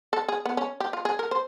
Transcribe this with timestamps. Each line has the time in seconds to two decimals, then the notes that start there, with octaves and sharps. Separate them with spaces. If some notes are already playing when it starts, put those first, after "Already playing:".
0.13 A4
0.28 G#4
0.45 B3
0.57 C#4
0.80 G4
0.93 F4
1.05 G#4
1.19 A#4
1.31 C5